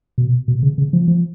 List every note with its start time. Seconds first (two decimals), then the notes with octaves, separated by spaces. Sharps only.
0.18 B2
0.48 B2
0.63 C#3
0.78 C#3
0.93 F3
1.08 F3